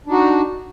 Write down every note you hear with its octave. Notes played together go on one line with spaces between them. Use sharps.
D4 D#4 F#4